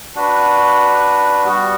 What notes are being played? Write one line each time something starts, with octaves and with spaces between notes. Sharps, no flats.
D4 F#4 B4
G3 B3 F#4